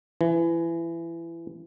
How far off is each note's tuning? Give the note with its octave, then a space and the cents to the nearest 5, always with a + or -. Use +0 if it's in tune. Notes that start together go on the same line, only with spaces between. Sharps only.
E3 +25